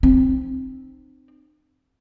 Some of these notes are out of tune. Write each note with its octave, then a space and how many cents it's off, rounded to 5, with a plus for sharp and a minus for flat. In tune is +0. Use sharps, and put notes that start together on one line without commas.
C4 +0 D#4 -40